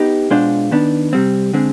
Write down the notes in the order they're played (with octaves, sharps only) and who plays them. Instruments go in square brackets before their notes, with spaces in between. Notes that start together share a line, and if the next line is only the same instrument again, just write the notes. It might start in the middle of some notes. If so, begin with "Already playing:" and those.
Already playing: [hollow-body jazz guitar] B3 D#4 G4
B2 G#3 D4 F4 C5
D#3 B3 D4
C3 G3 C4
D3 G#3 C4